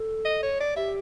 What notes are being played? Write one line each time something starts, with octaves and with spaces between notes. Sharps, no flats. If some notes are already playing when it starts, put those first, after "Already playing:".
Already playing: A4
D#5
C#5
D5
G4 E5